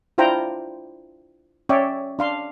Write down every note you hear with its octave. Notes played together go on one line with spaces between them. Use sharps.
D4 E4 F4 C5 G5 A#5
C#4 C#5 D5 E5 G5
D4 F5 C6